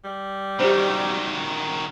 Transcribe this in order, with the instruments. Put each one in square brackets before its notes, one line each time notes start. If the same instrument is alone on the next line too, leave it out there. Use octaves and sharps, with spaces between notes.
[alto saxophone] G3
[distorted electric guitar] D#3 F#3 [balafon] G4 C5